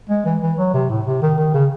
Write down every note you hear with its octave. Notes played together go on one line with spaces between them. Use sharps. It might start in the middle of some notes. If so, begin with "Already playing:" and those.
G#3
E3
E3
F#3
C3
A2
C3
D#3
D#3
C#3